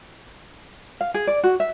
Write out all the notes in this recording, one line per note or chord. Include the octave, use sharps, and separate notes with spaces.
F5
G#4
D5
F#4
E5